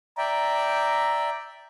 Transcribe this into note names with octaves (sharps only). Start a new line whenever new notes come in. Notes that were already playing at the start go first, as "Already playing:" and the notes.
D5 E5 G5 A#5